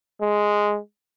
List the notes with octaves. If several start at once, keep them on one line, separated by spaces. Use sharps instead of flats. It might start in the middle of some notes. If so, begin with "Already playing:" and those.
G#3